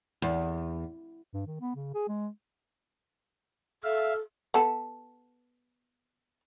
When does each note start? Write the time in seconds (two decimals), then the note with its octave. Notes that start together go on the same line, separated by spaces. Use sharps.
0.22 E2
1.34 G2
1.47 D#3
1.61 B3
1.76 C#3
1.94 G#4
2.09 G#3
3.84 A4 E5 F5
4.54 B3 A4